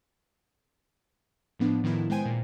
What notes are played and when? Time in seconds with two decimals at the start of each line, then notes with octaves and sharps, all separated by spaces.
1.59 A2 F3 B3 D4
1.84 A2 D#3 F3 B3 D4 E4
2.10 G#3 B3 C5 G5 G#5 D#7
2.26 A#2